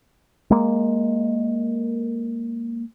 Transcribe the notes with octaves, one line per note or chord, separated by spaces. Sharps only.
G#3 A#3